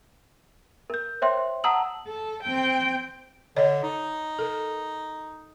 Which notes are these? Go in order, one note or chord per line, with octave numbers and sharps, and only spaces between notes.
A#4 G6
C5 C#5 E5 G5 C6
F#5 A5 A#5 D#6 E6 F#7
A4
C4 G5
D3 C#5 D#5
D#4
A4 A#4